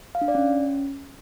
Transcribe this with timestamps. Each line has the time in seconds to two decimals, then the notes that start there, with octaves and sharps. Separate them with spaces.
0.15 F5
0.21 D4
0.28 D5
0.35 C#4